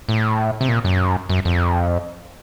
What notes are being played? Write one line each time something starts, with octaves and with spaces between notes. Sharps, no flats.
A2
C3
A#2
F#2
F#2
F2